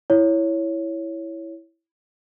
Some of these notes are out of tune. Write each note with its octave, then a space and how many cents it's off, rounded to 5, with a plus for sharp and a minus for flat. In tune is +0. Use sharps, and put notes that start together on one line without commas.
E4 +0 C#5 +0